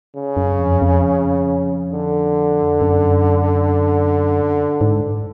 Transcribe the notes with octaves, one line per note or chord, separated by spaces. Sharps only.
C#3
F#2
F2
F2
D3
F#2
G#2